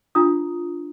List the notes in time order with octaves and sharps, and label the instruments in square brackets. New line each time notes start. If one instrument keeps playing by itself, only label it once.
[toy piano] D4 F4 A#5 D#6